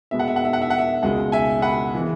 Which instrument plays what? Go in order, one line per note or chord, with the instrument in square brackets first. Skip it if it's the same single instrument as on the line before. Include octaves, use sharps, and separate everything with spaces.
[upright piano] B2 G#3 B3 E5
F#5
E5
F#5
E5
F#5
E5
F#5
E5
C#2 B2 G#3 F#5
E5 G#5
F#5 B5
E3 G#3 B3